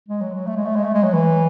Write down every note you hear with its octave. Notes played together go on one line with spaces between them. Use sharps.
G#3
F#3
F#3
A3
G#3
A3
G#3
A3
G#3
F#3
E3